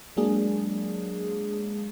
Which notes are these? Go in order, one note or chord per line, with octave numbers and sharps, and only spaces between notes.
F#3 G#3 A#3 D4 G#4